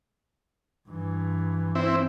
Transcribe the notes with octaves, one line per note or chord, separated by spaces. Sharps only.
G2 E3
C4 E4